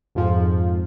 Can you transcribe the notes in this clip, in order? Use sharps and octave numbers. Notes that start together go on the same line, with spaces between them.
F2 G#2 F3